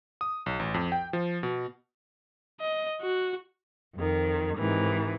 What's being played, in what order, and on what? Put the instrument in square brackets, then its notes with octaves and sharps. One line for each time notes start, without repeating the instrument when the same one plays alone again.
[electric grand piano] D#6
B1
A1
F2
G5
F3
B2
[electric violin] D#5
F#4
[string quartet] F2 D#3
G#2 C3 D#3 E3